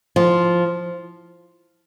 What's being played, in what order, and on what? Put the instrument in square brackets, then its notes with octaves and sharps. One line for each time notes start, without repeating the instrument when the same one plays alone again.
[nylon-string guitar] F3